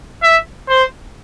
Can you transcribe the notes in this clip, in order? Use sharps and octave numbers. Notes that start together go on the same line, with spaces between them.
E5
C5